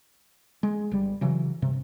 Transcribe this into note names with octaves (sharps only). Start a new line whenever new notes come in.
G#3
G1 G3
C#3 E3 F#3
G2 C3